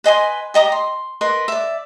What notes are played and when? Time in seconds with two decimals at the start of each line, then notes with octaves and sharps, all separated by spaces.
0.04 B4 D#5 G#5 C6
0.54 G4 D#5 A#5 D#6
0.72 C6
1.21 A#4 B4 D#5 C6
1.48 D5 E5